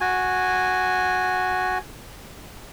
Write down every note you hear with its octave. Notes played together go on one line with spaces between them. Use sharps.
F#4 G#5